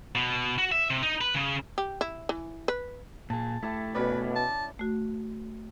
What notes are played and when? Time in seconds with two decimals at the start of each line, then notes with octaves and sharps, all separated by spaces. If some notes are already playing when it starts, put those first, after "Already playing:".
0.15 B2
0.58 F#4
0.72 E5
0.90 C3
1.03 D#4
1.21 B4
1.35 C#3
1.78 G4
2.01 E4
2.29 E3
2.68 B4
3.30 A#2 G#4 A5
3.63 A3 E4 G4 A5
3.95 B2 E3 C#4 B4 D5
4.36 A5
4.79 A3 F#4